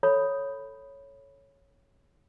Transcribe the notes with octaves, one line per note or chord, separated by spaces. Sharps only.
A4 C#5 B5